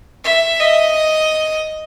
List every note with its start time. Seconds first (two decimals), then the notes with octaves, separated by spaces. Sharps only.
0.24 E5
0.60 D#5